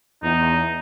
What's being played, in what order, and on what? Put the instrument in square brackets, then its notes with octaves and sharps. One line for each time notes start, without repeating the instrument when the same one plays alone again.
[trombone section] E2 [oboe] D#4